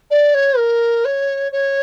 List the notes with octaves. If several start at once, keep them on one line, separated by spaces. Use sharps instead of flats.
D5
C#5
A#4
C#5
C#5